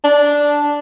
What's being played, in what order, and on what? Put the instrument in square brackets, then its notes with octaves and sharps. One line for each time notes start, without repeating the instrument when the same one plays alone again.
[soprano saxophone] D4